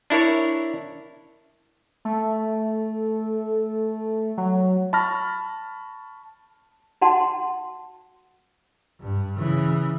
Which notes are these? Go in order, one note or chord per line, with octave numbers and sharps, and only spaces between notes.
D4 E4 A#4 C#5
A3
F#3
A5 B5 C#6 F6 A#6
D#4 F#4 F#5 A5 C6
G2
C#3 E3